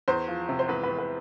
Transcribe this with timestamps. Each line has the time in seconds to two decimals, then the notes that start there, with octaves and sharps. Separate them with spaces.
0.08 E2 C5
0.28 F3
0.49 C3
0.59 C5
0.68 E2 B4
0.83 E2 B4
0.98 B4